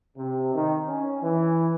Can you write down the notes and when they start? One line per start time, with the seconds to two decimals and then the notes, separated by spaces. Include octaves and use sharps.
0.16 C3
0.54 D#3
0.88 C#4
1.22 E3